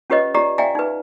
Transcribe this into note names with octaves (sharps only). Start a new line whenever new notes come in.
C#4 F4 G4 B4 C#5 D#5
F4 G4 D5 A#5
D5 E5 F5 G5 G#5 A#5
D#4 B4